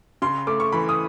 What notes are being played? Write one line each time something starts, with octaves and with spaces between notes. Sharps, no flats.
C#3 C6
A3 D6
C#6
E3 B5
D#6